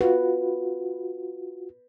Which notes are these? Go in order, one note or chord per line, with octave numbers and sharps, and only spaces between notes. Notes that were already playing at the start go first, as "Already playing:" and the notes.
F4 F#4 B4